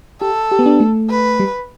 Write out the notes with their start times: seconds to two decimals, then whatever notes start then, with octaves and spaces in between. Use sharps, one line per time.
0.21 G4 A4
0.52 G4
0.59 B3
0.66 D4
0.80 A3
1.10 B4
1.40 G3